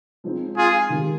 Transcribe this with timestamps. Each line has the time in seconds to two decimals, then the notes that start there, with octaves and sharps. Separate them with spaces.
0.24 F3 G#3 C4 D#4
0.56 F4 G#4
0.90 D#3 G#3 D#4 G4